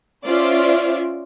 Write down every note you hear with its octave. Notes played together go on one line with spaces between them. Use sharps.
C#4 F4 C5 D5 E5